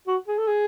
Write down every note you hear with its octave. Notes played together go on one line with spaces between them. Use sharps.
F#4
G#4
A4
G#4